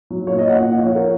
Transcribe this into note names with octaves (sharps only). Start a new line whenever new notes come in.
F#3
A#2 C#5
D#5
A#2 F#5
A#2 F#5
F5
F3
C#5
F3 A#4